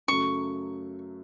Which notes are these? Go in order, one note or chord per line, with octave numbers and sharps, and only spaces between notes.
F#2 C#3 F#3 A3 C#6